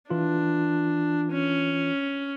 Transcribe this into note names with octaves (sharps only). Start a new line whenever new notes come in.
E3 D4 F4
C#4